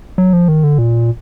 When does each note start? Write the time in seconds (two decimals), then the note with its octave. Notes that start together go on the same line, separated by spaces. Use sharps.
0.18 F#3
0.33 F3
0.48 D#3
0.63 D3
0.78 A#2